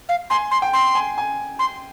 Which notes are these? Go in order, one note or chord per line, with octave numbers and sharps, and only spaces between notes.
F5
G#5 C6
C6
G5
C6
G#5
G#5
C6